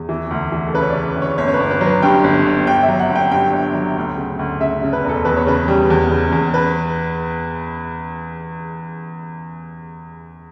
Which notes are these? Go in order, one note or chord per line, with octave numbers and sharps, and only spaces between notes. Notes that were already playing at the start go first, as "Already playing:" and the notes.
Already playing: E2
E3
D2
E3
A4
C#3 B4
C#5
D5
C#3
D2
C#5
G1 C#5
C#5
B4
G1
B4
F#3
B4
G2 G5
G1
G1
G1 G5
E5
F#3
F#5
G1
G5
G2 G5
G1
F#3
D2
C#3
D2
C#3 E5
C#3
B4
E1
A4
E2 B4
C#5
C#3 B4
G3
E2
C#3
E2
B4